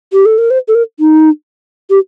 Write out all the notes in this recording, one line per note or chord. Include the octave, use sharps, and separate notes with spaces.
G4
A4
A#4
C5
A4
A#4
D#4
G4